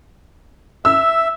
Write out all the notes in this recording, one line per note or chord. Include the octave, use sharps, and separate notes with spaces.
E5 E6